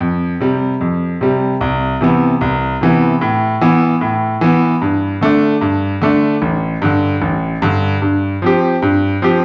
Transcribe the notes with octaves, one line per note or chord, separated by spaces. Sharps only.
F2
C3 G3
F2
C3 G3
C2
C3 E3 B3
C2
C3 E3 B3
A2
E3 B3
A2
E3 B3
G2
D3 A3 D4
G2
D3 A3 D4
A1
G2 D3
A1
G2 D3
G2
F3 C4 G4
G2
F3 C4 G4